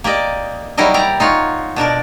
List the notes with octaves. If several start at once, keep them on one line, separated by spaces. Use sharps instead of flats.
A#3 G4 D5 D#5
F#3 G3 D#4 E4 A#4 D#5
E4 G4 D5 A#5
D#4 F4 C#5 F#5
B2 D4 A#4 D5